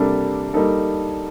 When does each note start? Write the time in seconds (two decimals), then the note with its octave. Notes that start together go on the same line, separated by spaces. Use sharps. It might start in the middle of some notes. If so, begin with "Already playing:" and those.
Already playing: C3 G3 A#3 D4 A4
0.54 G3 A#3 D#4 A4